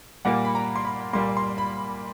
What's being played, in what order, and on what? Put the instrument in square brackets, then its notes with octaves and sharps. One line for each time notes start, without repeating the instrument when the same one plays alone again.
[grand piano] A#2 G3 A#3 F#5
B5
A#5
C6
B5
A#2 G3 A#3 C6
C6
B5